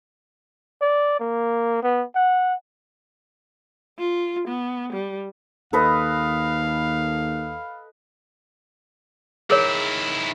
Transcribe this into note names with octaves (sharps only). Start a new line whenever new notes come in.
D5
A#3
B3
F#5
F4
B3
G3
D#2 A4 B4 D#5 F5
D#3 E4 G#4 A#4 C#5